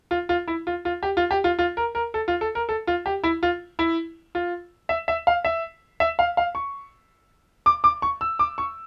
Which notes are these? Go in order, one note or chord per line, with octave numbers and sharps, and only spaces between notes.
F4
F4
E4
F4
F4
G4
F4
G4
F4
F4
A#4
A#4
A4
F4
A4
A#4
A4
F4
G4
E4
F4
E4
F4
E5
E5
F5
E5
E5
F5
F5
C#6
D6
D6
C#6
E6
D6
C#6